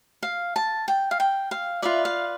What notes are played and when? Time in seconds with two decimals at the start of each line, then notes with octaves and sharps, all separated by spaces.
0.23 F5
0.56 A5
0.88 G5
1.11 F5
1.20 G5
1.51 F5
1.82 F4 B4 D5 E5
2.05 F5